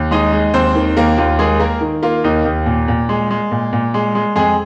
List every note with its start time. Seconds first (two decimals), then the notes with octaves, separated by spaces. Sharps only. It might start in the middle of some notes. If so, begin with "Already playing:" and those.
Already playing: D#2
0.11 G#3 D#4 D#5
0.32 G#3
0.54 D#2 C4 C5
0.75 D#3
0.97 D#2 A#3 A#4
1.18 D#2 F4
1.39 G#3 A#3 G#4
1.60 A#3 A#4
1.81 D#3
2.03 A#3 F4
2.24 D#2 D#4
2.45 D#2
2.66 A#2
2.88 A#2
3.09 G#3
3.31 G#3
3.51 A#2
3.73 A#2
3.94 G#3
4.15 G#3
4.36 F2 G#3 G#4